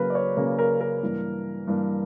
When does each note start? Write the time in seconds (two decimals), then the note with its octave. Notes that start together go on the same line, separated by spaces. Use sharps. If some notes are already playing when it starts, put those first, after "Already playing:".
Already playing: C#3 F#3 A#3 A#4 B4
0.10 D5
0.15 C#5
0.37 C#3 F#3 A#3 B4
0.59 A#4
0.81 A#4
1.02 G2 E3 A#3
1.67 G2 E3 A#3